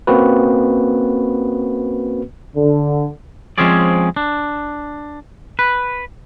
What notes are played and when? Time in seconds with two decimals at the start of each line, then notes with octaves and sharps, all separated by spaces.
0.07 A#3 C4 C#4 F#4 B4
2.56 D3
3.58 F3 G#3 C4 C#4 G#4 D5
4.16 D4
5.59 B4